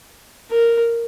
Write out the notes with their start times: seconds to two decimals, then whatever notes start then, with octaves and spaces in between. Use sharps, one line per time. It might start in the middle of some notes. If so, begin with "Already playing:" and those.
0.51 A#4